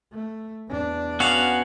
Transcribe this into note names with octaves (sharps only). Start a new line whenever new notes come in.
A3
E2 D4
B3 C#4 F#4 F5